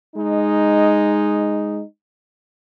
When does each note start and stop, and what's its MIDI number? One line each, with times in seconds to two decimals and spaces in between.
0.15 1.82 56
0.15 1.82 63